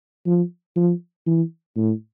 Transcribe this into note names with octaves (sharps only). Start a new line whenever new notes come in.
F3
F3
E3
A2